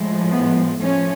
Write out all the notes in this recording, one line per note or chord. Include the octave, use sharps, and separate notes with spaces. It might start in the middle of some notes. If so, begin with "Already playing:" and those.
Already playing: A2 F3 G#3
B3
F3 A3 C#4